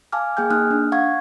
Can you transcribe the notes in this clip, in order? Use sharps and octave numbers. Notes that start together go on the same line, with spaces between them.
F5 G#5 A5 D6 F6
A#3 G#4 G5 G#5 F6 G6
A#3 D#4 D#6 F6 F#6
D4
F5 F#5 C#6 G#6